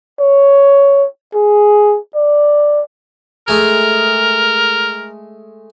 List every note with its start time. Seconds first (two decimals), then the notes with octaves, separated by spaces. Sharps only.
0.20 C#5
1.35 G#4
2.15 D5
3.48 G#3 A3 G#4 A#4